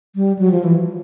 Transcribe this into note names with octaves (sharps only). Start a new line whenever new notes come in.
G3
F#3
F3
E3